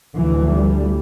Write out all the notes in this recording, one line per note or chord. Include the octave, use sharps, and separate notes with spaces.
D2 E3
G3